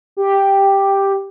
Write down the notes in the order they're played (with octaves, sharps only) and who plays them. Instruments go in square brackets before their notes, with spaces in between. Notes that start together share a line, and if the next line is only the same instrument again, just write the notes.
[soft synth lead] G4